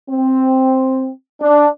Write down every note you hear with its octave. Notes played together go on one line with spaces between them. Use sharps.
C4
D4